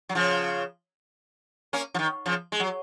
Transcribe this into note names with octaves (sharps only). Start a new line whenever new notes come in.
F#3
C#3 F3
A#3 C#4
F3
D#3
C#3 F3
G#3
F#3